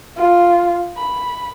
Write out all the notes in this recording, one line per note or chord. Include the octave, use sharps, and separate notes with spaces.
F4
B5